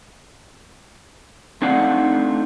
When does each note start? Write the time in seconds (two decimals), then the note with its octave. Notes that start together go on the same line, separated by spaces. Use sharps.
1.62 A3 C4 D4 D#4 F5 F#5